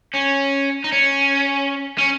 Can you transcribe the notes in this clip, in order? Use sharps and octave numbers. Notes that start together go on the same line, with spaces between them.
C#4
D#4
C#4
C#4